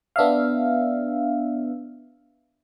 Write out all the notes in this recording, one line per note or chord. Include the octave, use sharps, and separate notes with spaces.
B3 D4 E5 F5